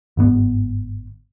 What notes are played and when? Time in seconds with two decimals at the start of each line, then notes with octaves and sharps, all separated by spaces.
0.17 G1 G#2 B3